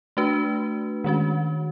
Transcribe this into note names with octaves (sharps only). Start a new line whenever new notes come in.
A3 D4 F#4 B4
D#3 G#3 C#4 F#4